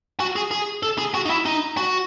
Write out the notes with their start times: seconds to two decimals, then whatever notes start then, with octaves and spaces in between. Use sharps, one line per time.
0.20 F#4
0.36 G#4
0.51 G#4
0.83 A4
0.98 G#4
1.15 F#4
1.26 D#4
1.30 E4
1.46 D#4
1.77 F#4